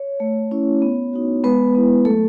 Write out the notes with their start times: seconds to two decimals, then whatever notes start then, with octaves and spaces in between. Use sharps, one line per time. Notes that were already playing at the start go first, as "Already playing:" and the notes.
Already playing: C#5
0.20 A3
0.51 C#4 E4
0.82 B3
1.13 D#4 F#4
1.44 G#3 B3 B4
1.75 B3 E4
2.05 F#3 A3 A4